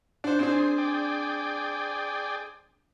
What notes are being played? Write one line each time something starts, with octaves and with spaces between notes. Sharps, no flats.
D4 C5 F#5
C4 D4 G#4 C5
G#4 D5 G5